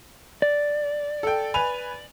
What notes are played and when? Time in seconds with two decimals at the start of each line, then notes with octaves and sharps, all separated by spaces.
0.42 D5
1.23 A4 G5
1.54 B4 G#5 F7